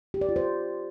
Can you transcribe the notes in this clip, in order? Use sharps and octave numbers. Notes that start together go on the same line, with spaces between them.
G4
D5
F4
C5